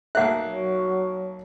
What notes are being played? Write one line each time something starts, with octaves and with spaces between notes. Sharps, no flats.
B1 A#3 E5 F#5 F#6
F#3